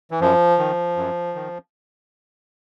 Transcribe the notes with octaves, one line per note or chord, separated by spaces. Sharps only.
E3
F#2 F3
D#3
F#2
D#3